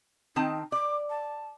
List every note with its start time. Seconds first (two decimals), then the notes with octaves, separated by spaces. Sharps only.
0.36 D#3 C4 D#4 A5
0.72 D5 D6
1.10 A5